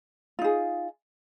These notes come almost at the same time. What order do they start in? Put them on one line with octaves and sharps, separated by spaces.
F4 D#4 G#4